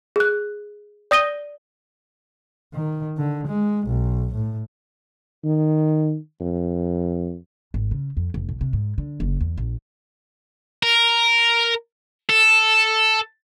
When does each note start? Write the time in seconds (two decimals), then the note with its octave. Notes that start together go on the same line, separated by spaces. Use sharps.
0.16 G#4 F#6
1.11 D5 D#6 A#6 D#7 G7
2.74 D#3
3.17 D3
3.47 G#3
3.87 B1
4.35 A2
5.44 D#3
6.41 F2
7.74 G#1
7.91 C#3
8.17 F2
8.34 F1
8.49 B1
8.61 C3
8.73 G#2
8.98 D3
9.20 F#1
9.41 E2
9.57 A#1
10.83 A#4
12.30 A4